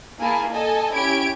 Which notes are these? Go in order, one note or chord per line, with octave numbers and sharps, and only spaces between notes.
A#3 E4 G#4 G#5 A5
A4 D#5 G#5 A5
C#4 E4 G4 G#6 D7